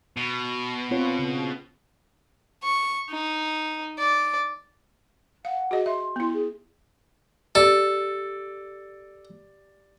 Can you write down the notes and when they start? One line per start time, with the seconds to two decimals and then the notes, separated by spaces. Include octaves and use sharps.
0.17 B2
0.91 C4 F4 C#5
1.19 C#3
2.64 C#6
3.10 D#4
3.99 D5
5.45 F5 F#5
5.71 F#4 G#4 D#5
5.86 E5 C6
6.16 B3 E4
6.33 G#4
7.55 G4 A4 D5